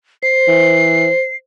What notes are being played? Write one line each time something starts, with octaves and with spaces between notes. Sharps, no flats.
C5 C7
E3